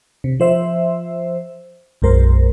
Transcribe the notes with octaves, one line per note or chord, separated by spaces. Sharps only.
C3
F3 C5 E5
B1 F#2 G#3 A#4 C5